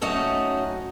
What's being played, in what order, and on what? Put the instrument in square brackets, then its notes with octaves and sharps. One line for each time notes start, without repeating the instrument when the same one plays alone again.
[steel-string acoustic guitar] F#3 A3 C#4 D#4 F#4 D#5